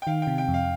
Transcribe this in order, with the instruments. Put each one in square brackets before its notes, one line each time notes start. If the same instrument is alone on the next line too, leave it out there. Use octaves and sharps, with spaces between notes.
[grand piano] G5
[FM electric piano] D#3 [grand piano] F5
[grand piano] G5
[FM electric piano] C3
[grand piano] G5
[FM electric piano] F2
[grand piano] F5